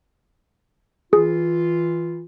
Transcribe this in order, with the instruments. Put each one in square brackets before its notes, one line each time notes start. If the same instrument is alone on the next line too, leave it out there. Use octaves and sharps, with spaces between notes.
[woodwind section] E3 F4 [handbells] G#4